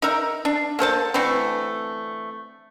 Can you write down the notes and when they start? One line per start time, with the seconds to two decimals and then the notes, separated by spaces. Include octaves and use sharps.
0.02 D#4 A#4 E5 A#5
0.45 D4
0.79 A#3 A4 C5 A5
1.14 D3 E3 A3 C4